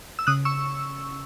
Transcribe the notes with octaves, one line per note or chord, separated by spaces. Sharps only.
E6
C#3 D#6 F#6
C#6 E6